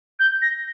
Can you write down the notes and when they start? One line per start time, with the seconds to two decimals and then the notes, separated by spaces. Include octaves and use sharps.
0.19 G6
0.42 A#6